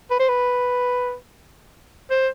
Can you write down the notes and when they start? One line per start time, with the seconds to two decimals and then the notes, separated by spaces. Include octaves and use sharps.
0.10 B4
0.19 C5
0.29 B4
2.10 C5